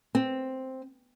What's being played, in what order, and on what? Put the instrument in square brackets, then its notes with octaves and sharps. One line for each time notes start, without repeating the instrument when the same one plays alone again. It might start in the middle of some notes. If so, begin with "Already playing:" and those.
[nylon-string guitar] C4